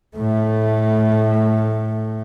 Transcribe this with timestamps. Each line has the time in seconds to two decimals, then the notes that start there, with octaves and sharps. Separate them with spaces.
0.17 A2 A3